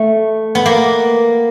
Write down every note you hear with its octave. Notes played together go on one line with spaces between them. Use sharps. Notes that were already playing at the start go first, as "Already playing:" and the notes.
Already playing: A3
B3
A#3